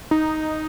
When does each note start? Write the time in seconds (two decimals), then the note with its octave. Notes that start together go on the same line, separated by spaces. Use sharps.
0.11 D#4